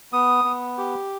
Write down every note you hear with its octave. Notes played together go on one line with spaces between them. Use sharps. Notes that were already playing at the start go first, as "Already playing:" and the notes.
B3 D#6
B3
G4